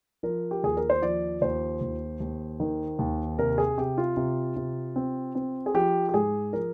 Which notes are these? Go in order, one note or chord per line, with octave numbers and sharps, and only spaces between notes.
F3 A#4
G4
D#2 G#4
A#4
C5
F3 D5
D#2 C5
D#2
D#2
D#3
D#2
C3 A#4
G#4
C3 G4
F4
C3
C3
C4
C4
G#4
F3 G4
G4
G#2 G#4
F3 A#4